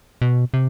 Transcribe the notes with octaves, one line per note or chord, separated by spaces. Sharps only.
B2
C3